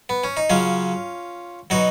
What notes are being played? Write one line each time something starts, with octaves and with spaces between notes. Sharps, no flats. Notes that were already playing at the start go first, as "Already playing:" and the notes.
B3
C#4
D#4
C#3 F#3 C#4 F4
B2 F#3 D#4 F#4